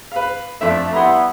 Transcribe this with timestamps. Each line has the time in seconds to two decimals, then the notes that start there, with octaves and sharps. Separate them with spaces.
0.12 B4 F5
0.61 F2 A3 D4 E5
0.93 G3 B3 E4 A#5 C6